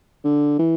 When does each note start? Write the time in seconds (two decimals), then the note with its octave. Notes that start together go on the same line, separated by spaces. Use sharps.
0.24 D3
0.58 E3